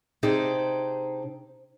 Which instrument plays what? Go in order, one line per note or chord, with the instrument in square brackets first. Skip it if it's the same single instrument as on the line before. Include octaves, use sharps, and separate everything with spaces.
[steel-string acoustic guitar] C3 D4 D#4 G4 G#4 C5